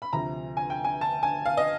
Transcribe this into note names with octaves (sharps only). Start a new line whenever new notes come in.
B5
D2 C3 F3 A#5
G#5
G5
G#5
A5
G#5
F5
D#5